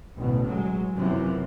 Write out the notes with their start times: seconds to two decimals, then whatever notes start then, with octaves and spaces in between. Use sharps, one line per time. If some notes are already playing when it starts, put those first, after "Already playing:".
0.16 A1 D2 B2
0.46 F#3 G#3
0.96 F#2 C3 E3 F3